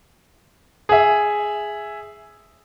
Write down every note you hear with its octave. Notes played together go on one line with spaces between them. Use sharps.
G#4 E5